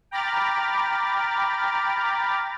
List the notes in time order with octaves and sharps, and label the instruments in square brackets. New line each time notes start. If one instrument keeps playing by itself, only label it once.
[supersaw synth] G5 A#5 B5 D6 F6 A6